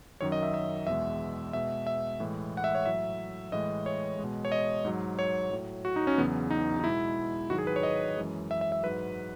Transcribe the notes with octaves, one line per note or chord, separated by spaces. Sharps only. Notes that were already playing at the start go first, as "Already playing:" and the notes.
F#2 D#3 F#3 C#5
D#5
E5
E5
E2 B2 G#3 E5
B2 G#3 E5
E5
A2 E3 G#3
F#5
E5
C#5
A2 F#3 E5
A2 E3 G#3 D#5
C#5
B2 G#3
C#5
D#5
G#2 F#3
C#5
A2 F#3
F#4
D#4
C#4
E2 C#3 F#3 B3
D#4
D#4
B2 G#3 E4
G#2 D#3 F#3 F#4
G#4
B4
C#5
D#5
F#2 E3 G#3
E5
E5
E5
G#2 F#3 B4